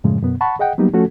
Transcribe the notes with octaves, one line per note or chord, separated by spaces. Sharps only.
F#2 A2 C#3 F3 G#3
F#2 B2 B3
F#5 A5 B5 C#6
G#4 D#5 F#5 G5
F#3 G3 A#3 B3 D#4 G4
F3 A3 C#4 F#4 A4